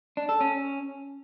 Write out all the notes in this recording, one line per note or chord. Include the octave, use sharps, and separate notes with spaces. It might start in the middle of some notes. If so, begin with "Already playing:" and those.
D4
A4
C#4